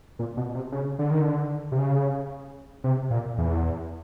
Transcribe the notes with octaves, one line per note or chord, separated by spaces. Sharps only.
A#2
B2
C3
C#3
D3
D#3
D3
C3
C#3
C3
A#2
E2